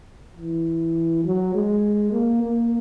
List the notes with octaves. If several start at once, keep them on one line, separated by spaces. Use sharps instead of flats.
E3
F#3
G#3
A#3
A#3